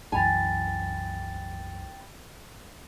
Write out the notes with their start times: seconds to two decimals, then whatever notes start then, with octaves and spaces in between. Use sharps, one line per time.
0.12 C2 F#2 E3 G5 G#5 B5 A6